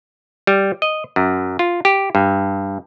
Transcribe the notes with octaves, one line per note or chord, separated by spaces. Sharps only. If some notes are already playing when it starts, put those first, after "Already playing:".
G3
D#5
F#2
F4
G4
G2